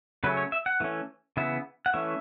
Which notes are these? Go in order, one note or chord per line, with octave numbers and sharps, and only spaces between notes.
C#3 F#3 A3 C#4 B4
C#5
E5
F#5
E3 A3 C#4
C#3 E3 B3 E5
F#5
E3 A3 C#4 E5